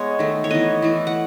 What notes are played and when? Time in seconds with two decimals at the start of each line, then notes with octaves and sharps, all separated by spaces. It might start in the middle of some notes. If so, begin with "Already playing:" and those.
Already playing: G#3 B3 C#5
0.19 D#3 A3
0.44 C#5
0.51 E3 B3 D#5
0.82 E3 A3
1.07 F#5